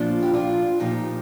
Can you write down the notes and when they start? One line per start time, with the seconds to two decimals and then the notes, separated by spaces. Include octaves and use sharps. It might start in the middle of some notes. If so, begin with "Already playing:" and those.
Already playing: A#2 F3 D4 F4
0.23 G4
0.34 D4 F4
0.80 A#2 F3 D#4 G4